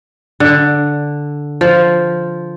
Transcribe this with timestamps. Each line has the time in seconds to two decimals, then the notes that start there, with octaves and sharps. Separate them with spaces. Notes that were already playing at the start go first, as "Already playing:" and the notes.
0.40 D3
1.61 F3